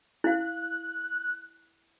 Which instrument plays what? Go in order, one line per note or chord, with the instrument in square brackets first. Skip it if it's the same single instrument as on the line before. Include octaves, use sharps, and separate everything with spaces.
[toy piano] E4 F5 [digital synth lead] F#6